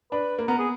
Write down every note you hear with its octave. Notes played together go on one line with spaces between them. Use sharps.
D4 B4
A#3
B3 A#4
G#4